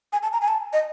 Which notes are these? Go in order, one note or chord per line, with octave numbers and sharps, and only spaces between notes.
G#5
A5
A#5
G#5
A5
D#5